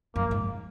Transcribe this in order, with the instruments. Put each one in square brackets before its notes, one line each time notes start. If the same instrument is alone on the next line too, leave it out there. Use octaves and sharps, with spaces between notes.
[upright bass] F#2 [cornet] A#3
[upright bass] G#2